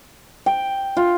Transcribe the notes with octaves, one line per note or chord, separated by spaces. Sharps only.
G5
F4